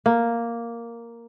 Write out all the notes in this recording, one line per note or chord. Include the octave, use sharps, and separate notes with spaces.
A#3